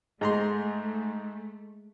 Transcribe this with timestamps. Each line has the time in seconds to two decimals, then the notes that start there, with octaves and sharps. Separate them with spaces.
0.21 G#2 G#3 A3 A#5 C6